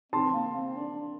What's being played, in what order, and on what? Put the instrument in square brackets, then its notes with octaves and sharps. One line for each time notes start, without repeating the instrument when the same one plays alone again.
[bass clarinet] C4 [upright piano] A5 C6
[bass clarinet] A#3
C4
D4